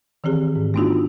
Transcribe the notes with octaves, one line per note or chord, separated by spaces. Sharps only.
D#3 E3 C4 G4 G#4
G#2
A3 B3 D4 D#4 F4 F#4